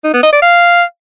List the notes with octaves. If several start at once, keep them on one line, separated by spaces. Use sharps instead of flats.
D#4
B3
D#5
D5
F5